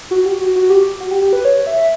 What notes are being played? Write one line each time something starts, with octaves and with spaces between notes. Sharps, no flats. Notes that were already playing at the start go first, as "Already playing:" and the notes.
F#4
G4
F#4
F#4
G4
F#4
G4
G4
B4
C#5
E5